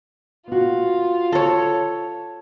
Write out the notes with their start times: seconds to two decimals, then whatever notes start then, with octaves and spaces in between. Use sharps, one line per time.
0.48 B3 F4 F#4
1.32 A4 C#5